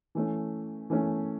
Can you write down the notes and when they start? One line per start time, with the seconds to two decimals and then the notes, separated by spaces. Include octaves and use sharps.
0.15 E3 A3 C#4
0.90 E3 A3 C#4